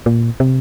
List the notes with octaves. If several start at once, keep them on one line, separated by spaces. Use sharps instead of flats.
A#2
C3